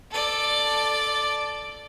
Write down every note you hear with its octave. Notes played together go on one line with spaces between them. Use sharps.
A4 D5